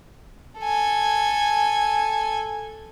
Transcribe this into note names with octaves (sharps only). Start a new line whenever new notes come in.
A4 G#5